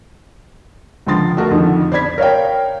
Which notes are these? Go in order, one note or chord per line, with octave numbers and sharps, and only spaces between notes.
C#2 D3 F3 C6 A6
A3 F#4 A#4
F2 D3 D#3 F3
C5 D5 B5 G#6 B6
A#4 C#5 F5 G5